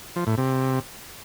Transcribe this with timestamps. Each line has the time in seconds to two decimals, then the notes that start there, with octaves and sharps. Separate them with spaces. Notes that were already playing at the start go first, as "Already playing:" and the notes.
0.16 F3
0.27 A2
0.38 C3